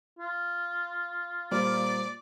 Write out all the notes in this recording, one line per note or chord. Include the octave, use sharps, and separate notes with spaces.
F4
A#2 G3 C5 D5